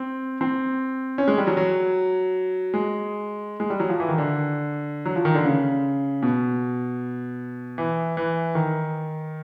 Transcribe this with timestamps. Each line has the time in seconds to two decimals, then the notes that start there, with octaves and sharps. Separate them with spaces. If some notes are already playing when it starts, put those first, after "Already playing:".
Already playing: C4
0.41 C4
1.18 C#4
1.28 G#3
1.38 G3
1.47 F#3
1.57 F#3
2.74 G#3
3.60 G#3
3.70 G3
3.80 F#3
3.89 F3
4.00 E3
4.09 D#3
4.18 D3
5.05 F#3
5.16 F3
5.25 D#3
5.35 D3
5.45 C#3
6.22 B2
7.78 E3
8.17 E3
8.55 D#3